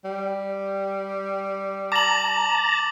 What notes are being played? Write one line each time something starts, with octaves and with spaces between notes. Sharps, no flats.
G3
A5 A#5 D6 F#7